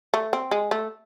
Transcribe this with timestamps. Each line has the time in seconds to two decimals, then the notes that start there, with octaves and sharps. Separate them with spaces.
0.14 A3
0.33 C4
0.51 G#3
0.71 A3